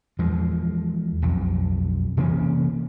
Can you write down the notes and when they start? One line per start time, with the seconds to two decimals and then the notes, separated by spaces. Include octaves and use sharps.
0.19 E2 F3 G#3
1.22 B1 F2
2.17 C3 E3 A#3 C#4